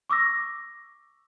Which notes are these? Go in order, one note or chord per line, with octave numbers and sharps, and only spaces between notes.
C#6 D6 E6 A#6